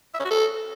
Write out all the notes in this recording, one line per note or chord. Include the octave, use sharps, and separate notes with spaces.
E5
C#4
F#4
A4